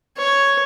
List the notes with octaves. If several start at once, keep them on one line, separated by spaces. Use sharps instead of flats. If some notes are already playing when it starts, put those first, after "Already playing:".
C#5